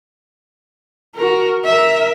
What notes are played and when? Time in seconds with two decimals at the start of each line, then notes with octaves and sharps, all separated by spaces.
1.15 F#4 A#4
1.64 A#4 E5